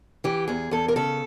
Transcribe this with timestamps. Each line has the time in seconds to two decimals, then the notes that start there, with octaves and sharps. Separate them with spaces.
0.24 E3 G4
0.48 E2 G#4
0.71 E2 A4
0.88 A#4
0.96 C#3 A4